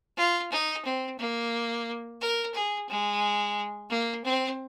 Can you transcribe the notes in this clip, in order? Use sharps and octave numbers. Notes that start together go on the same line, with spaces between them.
F4
D#4
C4
A#3
A#4
G#4
G#3
A#3
C4